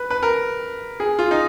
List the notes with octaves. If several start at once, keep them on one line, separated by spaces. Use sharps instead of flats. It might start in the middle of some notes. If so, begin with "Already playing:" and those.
Already playing: B4
B4
A#4
G#4
F4
D#4